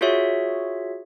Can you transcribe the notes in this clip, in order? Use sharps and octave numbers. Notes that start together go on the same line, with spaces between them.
F4 F#4 G#4 C#5 E5